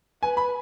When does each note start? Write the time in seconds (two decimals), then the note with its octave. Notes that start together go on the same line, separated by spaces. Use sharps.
0.23 B4 G#5
0.37 B5